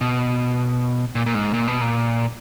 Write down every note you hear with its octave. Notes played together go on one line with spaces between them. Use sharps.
B2
A#2
A#2
G#2
A#2
B2
A#2